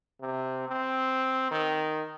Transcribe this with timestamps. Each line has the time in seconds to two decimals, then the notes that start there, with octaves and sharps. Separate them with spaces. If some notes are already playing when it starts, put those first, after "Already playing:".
0.21 C3
0.68 C4
1.51 D#3